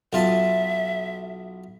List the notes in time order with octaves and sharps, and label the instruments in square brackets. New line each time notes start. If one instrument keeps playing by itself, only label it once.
[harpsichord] B1 F4 A5 [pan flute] E5